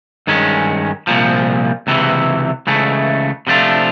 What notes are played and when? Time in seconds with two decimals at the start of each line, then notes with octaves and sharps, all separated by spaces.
0.27 G2 D#3 G#3 C#4
1.07 C2 A#2 F3
1.87 C#2 C3 E3
2.67 C#2 C#3 E3 A3
3.47 C3 F3 A3 D4 F4